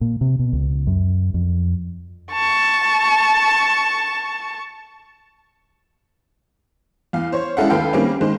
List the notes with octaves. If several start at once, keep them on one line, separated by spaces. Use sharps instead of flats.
A#2
C3
B2
C#2
F#2
F2
A5 C#6
E2 F5
C5 C#5
G#3 C#4 E4 A4 F5 F#5
D#2 A4 B4 F5 G5
D#3 G3 A#3 C4 C#4
D#3 G#3 C5